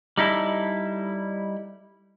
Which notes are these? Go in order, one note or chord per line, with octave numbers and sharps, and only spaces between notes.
G3 D#4 E4 A4